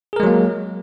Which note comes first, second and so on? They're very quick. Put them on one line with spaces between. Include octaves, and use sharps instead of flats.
G#4 A#4 G#3 F#3 A#3